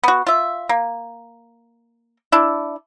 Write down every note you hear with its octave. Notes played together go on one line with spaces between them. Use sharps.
B3 F#4
F4 E5
A#3
D4 E4